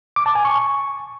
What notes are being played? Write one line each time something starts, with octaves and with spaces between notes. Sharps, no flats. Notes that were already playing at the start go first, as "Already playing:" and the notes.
D6
A5
G#5
C#6